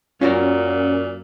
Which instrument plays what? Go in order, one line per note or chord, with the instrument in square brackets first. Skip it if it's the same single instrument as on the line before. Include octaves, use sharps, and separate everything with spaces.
[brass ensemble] F#2 [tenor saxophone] A#2 [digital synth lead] C#4 [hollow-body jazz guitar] F4 F#4 A#4